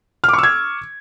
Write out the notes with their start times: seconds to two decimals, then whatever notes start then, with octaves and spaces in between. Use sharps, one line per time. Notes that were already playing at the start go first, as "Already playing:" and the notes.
0.24 F6
0.29 D6
0.33 C#6
0.38 E6
0.43 G#6